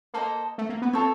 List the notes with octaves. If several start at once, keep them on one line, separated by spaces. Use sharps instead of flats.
A#3 A4 C5 D#5
A3
A#3
B3
C4 F4 A4 C#5